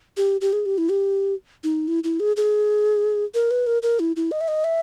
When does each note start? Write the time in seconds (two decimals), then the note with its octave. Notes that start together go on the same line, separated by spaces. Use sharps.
0.17 G4
0.41 G4
0.53 G#4
0.66 G4
0.78 E4
0.90 G4
1.64 D#4
1.88 E4
2.04 E4
2.20 G#4
2.37 G#4
3.34 A#4
3.51 B4
3.67 A#4
3.83 A#4
4.00 E4
4.16 E4
4.31 D#5
4.41 E5
4.48 D#5
4.64 E5